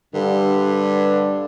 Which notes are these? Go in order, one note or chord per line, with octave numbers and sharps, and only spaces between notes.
G2 D3